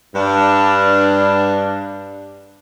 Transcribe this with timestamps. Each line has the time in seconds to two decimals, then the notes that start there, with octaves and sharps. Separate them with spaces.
0.15 G2 D4